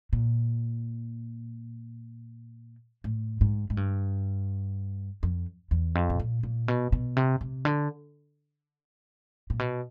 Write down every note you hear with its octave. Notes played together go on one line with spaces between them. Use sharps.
A#2
A2
G#2
G#2
G2
F2
E2
F2
B2
A#2
A#2
B2
B2
C3
C3
D3
A#2
B2